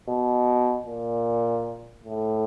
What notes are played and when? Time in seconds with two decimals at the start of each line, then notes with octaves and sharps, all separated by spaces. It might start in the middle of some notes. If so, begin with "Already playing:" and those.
0.09 B2
0.86 A#2
2.03 A2